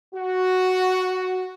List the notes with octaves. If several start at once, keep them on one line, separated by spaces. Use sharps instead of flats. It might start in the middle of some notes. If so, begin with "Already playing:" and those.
F#4